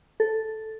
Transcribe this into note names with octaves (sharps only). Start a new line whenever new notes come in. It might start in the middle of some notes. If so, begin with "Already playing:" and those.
A4